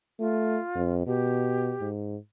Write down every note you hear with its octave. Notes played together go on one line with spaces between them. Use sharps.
A3 F4
F2
B2 G4
G#2